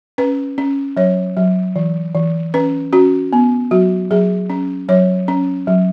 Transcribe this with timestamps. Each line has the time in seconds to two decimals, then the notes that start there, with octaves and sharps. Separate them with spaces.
0.18 C#4 B4
0.58 C#4
0.97 F#3 C#5
1.37 F#3
1.76 E3
2.15 E3
2.54 C#4 B4
2.93 C#4 F#4
3.33 B3
3.71 F#3 F#4
4.11 F#3 G#4
4.50 C#4
4.88 F#3 C#5
5.28 C#4
5.67 F#3